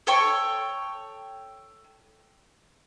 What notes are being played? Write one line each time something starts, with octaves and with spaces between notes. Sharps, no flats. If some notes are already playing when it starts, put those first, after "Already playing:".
A4 C#5 G5 C#6